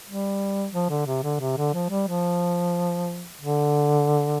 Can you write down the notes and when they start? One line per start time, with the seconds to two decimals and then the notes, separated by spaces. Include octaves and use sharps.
0.07 G3
0.73 F3
0.89 D3
1.07 C3
1.23 D3
1.40 C3
1.57 D3
1.74 F3
1.90 G3
2.08 F3
3.41 D3